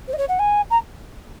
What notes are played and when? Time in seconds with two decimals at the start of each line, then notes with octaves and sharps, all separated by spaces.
0.08 C5
0.13 D#5
0.18 C#5
0.29 F#5
0.39 G#5
0.70 A#5